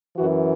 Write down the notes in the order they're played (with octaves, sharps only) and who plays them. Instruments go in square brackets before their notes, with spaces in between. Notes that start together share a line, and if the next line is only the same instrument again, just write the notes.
[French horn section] F#2 E3 F#4